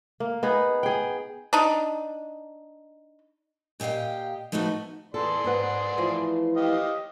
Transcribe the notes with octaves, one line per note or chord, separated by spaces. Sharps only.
A#3
B3 D#4 G#4
G#4 G5
D4 D#4
A#2 G4 D#5 F5 G5
F3 A3 B3 D#4 F#4
E2 G#4 A4 D5 C6
G#2 B4 F#5
E3 F3 A3
G4 D#5 F5